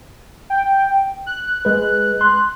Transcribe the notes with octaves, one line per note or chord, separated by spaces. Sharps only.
G5
F#6
G#3 B4
C6